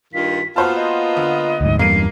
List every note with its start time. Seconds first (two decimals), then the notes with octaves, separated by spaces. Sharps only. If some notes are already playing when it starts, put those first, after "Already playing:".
0.13 G2 D#3 F4 B6
0.56 A#3 B3 F4 F#4 C5 A5 F6
0.76 D#5
1.17 D3
1.61 D2 G#2
1.79 E2 G2 A#3 C7 D#7